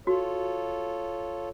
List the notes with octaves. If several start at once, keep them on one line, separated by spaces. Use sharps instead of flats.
F4 F#4 A4 C#5